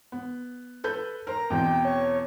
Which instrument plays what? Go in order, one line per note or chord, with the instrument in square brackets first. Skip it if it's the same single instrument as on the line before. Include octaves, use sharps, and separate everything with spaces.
[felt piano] B3
A4 B4 G6
[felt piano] A#4 C5 [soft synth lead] A#5
[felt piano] E2 B2 C4 [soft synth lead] G5
[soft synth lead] C#5